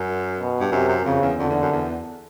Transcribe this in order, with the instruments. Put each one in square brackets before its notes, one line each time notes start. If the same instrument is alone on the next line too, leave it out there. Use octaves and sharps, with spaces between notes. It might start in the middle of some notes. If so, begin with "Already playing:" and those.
Already playing: [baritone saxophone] F#2
[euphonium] B2
[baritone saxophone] G2
[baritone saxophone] F#2 [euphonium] C3
[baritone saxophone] F#2
[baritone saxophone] F2 [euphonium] C#3
[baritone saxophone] E2
[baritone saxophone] F2 [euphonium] D3
[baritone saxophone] E2
F#2
E2